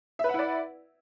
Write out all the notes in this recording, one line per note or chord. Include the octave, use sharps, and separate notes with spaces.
E4 B4 D5 E5 F#5